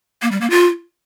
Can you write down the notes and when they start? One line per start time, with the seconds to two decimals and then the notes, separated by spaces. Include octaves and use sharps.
0.22 A#3
0.31 G3
0.41 A#3
0.50 F4